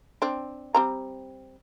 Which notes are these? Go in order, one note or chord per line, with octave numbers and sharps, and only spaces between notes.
C4 D4
G3 C4 A#5